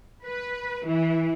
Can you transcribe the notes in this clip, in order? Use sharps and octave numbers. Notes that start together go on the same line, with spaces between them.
B4
E3